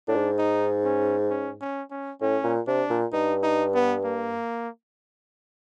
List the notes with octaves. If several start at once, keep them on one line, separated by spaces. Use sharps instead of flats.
A2 D4
G#2
D#4
C#4
C#4
C#4
C#4
A2 C#4
A#2
C3 D4
A#2
G2 D#4
D#4
B3
A#3